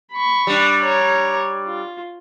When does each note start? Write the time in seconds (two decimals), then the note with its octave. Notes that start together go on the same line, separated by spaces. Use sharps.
0.12 B5 C#6
0.47 G3 D4
0.83 C#5 A#5
1.67 F4